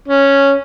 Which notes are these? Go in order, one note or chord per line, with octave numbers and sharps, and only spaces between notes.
C#4